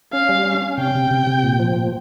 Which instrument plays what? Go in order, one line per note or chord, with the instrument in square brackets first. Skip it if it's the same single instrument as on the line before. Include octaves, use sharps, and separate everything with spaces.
[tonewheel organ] C#4 [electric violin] F5
[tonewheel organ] G3
C#4
C#4
[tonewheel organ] C3 [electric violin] G5
[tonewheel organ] C3
C3
C3
A#2
F3
A#2